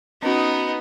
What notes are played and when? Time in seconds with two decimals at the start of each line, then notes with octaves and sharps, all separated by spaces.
0.23 B3 C#4 D#4 F#4